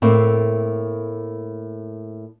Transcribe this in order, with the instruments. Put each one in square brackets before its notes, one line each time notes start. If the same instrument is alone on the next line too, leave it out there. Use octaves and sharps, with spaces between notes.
[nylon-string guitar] A2 A3 A#3 C4